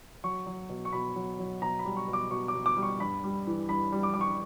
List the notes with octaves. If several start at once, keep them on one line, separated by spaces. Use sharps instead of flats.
F#3 C#6
F#3
B2
C#6
B2 B5
F#3
F#3
B2 A#5
B5
G3
C#6
B2
D6
B2 C#6
D6
B2
D6
G3
C#6
G2 B5
G3
E3
G2 B5
G3
D6
G3 D6
C#6